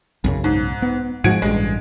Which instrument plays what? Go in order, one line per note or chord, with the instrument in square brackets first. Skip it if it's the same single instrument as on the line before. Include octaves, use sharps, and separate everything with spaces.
[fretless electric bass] B1 F#2 C#3
[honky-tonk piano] G#2
[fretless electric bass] B3
[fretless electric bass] G#2 F3 G#3 [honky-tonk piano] F#4 G#6 D7
[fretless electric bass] A1 G2 [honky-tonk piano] G#3